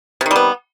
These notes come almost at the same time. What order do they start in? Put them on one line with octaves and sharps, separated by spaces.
C3 D#3 G3 B3